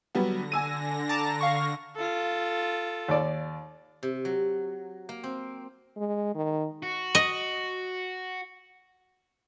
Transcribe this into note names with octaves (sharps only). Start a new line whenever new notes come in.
D3 F#3 G3 B3 A#6
G#5 E6 D#7
A5 A#5 D6
F5 C#6
F4 A4
D#2 D5
C3
F#3
A#3
C4
G#3
D#3
F#4
D#5